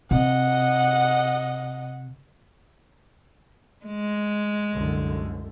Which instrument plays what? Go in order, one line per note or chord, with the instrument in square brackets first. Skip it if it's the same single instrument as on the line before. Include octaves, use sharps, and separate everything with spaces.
[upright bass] C3 [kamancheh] D#5 F#5
[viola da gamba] G#3
[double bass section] C2 F#2 D3